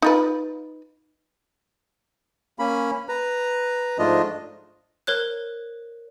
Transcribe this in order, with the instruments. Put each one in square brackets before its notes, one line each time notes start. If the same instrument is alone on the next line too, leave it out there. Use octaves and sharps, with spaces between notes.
[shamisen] D#4 F4 B4
[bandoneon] A#3 C#4 B5
B4 A#5
G#2 F3 A3 D4 F4 D#5
[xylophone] A#4 C5 C#5 F#6